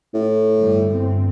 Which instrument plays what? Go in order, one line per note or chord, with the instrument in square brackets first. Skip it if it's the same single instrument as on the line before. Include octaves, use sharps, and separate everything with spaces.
[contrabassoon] A2
[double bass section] G1 G3
G1 C4